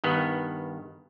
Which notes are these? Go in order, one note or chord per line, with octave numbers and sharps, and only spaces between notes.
G2 D#3 B3